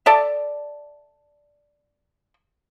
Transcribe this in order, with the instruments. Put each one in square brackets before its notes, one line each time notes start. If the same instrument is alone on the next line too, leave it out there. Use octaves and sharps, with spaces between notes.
[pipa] A4 D5 E5